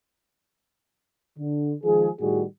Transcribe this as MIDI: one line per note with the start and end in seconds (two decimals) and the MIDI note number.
1.38 1.73 50
1.84 2.09 51
1.84 2.09 53
1.84 2.09 56
1.84 2.09 68
2.20 2.44 45
2.20 2.44 51
2.20 2.44 55
2.20 2.44 66
2.20 2.44 68